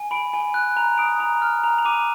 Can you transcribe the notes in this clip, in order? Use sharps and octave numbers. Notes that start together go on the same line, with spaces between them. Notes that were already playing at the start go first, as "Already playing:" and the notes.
Already playing: G#5
B5 D7
G#5
F#6
A#5
D#6 D7
A#5
F6
A#5
F7
D6 D#7